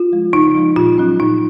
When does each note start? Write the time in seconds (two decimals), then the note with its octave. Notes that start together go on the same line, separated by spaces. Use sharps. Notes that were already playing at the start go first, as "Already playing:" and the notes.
Already playing: F4
0.12 F3 G#3
0.33 C#3 D#4
0.55 F3 G#3
0.76 A#2 F4
0.98 F#3 C#4
1.20 A#2 D#4